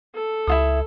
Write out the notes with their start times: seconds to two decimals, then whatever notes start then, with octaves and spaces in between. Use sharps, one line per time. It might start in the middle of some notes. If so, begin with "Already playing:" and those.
0.15 A4
0.47 C#2 E4 F4 D#6